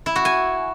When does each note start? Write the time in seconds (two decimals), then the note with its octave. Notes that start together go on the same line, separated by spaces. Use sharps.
0.06 E4
0.16 F#4
0.25 G#5